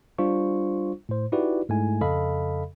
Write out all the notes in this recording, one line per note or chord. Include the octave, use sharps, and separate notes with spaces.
G3 D4 F4 C5 C#6
A2 C5
D#4 E4 F#4 G4 B4 D5
G#2 G#3 A3 E4 G#5
F2 C#3 A4 D#5 F5 B5